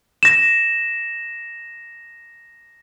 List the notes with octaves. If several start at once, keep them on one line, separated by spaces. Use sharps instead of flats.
A#6 E7